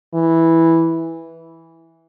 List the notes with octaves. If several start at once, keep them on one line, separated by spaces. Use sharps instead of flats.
E3